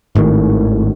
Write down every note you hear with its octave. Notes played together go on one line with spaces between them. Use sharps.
G#1 A2 D3 D#3